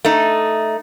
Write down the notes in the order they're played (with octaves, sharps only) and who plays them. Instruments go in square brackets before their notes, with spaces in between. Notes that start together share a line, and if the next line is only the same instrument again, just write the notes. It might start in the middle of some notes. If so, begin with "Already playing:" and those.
[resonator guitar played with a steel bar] A3 D#4